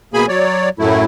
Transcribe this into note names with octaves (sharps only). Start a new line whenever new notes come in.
B2 A#3 G#4 G#5 B5
F#3 C#5 D5
F#2 A2 F#3 A3 E4